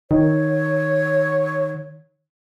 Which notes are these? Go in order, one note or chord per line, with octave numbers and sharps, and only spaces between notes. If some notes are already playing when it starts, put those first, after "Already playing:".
D#3 C#5